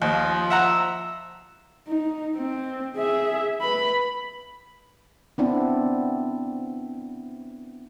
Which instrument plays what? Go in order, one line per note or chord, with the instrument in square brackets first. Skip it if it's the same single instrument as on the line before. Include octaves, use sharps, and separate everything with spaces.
[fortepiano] D#2 [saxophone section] F3 [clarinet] D#5
[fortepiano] E5 F#5 A#5 [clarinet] E6
[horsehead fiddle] D#4
C4
G#4 E5
B4 B5
[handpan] B3 C4 D4 E4